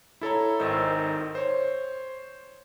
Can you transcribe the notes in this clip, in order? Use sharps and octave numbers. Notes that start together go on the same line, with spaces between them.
E4 A4 C#5 A#5
G#1 D#3 D#4 C5 E6
C5 C#5